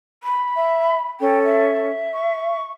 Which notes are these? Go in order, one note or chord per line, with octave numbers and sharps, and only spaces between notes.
B5
E5
C#4 A4 G5
E5
C#6